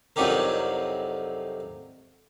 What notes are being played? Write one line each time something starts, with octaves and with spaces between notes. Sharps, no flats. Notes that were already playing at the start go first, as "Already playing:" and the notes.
C2 F2 F#3 D#4 G4 A#4